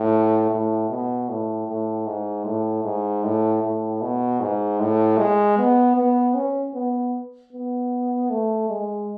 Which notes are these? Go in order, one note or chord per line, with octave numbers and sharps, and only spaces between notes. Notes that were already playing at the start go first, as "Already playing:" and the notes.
Already playing: A2
A2
B2
A2
A2
G#2
A2
G#2
A2
A2
B2
G#2
A2
G#3
B3
B3
C#4
B3
B3
A3
G#3